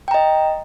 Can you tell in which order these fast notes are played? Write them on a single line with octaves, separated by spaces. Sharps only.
G5 A#5 D#5